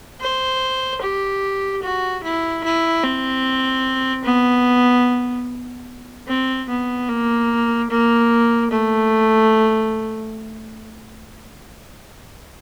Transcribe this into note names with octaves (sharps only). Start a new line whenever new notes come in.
C5
G4
F#4
E4
E4
C4
B3
C4
B3
A#3
A#3
A3